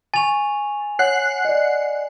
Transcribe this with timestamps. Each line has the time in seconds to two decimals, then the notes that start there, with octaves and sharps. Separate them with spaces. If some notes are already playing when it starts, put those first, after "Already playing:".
0.14 G#5 C#6 A6 F7
0.99 C#5 F#5 F#6 C7
1.45 D5 D#5